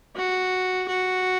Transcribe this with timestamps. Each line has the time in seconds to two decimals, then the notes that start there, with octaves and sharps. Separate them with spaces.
0.16 F#4
0.89 F#4